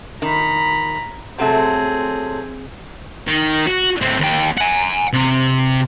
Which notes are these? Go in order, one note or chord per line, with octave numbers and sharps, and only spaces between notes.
D#3 A#5 B5
C3 F#3 A3 C4 G#4
D#3
F#4
A2 C4
D#2 G5
F#5 G#5
C3